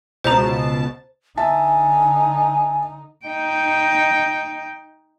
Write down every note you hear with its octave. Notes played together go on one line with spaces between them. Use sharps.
C#2 B2 C5 A5 A#5
D3 D#4 E5 G#5 A5
D#4 G5